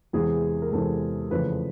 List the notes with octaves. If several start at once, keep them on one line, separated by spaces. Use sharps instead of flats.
E2 C3 E3 G#3 G#4
A#4
E2 C3 E3 G#3 A4
F2 C#3 E3 A3 B4